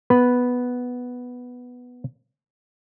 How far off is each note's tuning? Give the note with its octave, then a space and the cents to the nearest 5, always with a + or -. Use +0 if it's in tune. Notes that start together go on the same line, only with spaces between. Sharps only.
B3 +0 B4 +0